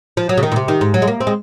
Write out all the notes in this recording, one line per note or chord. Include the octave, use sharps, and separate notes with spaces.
F3
F#3
C#3
D#3
A#2
C3
D#3
G#2
F#3
G#3
A#3
C4
G#3